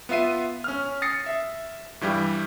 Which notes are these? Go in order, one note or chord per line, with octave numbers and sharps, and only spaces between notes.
B3 F4 E5 C7 D#7
C#4 F6
D#6 A6 A#6 C7 C#7
E5
G2 E3 G3